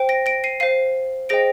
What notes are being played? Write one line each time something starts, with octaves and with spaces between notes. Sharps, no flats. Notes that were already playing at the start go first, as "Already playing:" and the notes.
Already playing: C5 G5
A#6 D7
A#6 D7
C7 D#7
C5 F5 C7 D#7
G#4 C5 D#5 G5 A#6 D7